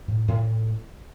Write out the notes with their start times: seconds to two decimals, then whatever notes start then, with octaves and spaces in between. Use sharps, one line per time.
0.08 A2
0.28 A2